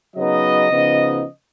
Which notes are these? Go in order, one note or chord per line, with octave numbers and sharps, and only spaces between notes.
C#3 F#3 B3 D#4 D#5
C#3 F3 B3 D#4